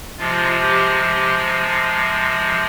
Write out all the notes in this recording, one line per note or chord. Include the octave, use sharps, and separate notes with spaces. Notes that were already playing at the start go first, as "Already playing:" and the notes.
C3 F3 G#3 F4
G4
G4